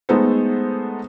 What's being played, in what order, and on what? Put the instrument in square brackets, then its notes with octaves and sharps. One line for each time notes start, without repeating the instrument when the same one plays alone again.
[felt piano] G#3 A3 B3 D#4 A4 C5